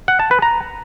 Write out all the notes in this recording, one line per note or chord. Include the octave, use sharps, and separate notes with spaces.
F#5
A5
B4
A#5